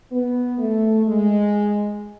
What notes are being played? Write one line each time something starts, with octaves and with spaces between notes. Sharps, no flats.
B3
A3
G#3